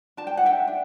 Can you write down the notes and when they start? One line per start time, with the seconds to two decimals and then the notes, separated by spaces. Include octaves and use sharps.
0.17 D4 A5
0.27 G5
0.37 F#5
0.44 D4 E5 G5
0.67 D4